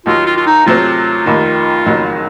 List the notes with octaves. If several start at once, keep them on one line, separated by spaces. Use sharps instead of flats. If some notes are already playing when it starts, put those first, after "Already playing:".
D#2 D#3 F#3 F4
F4
F4
D#4
C3 F#3 A3 C4 F4
F1 D#2 D#3
F#1 F2 D#3 F#3